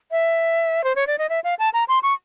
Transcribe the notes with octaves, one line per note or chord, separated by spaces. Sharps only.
E5
C5
C#5
D5
D#5
E5
F5
A5
A#5
C6
C#6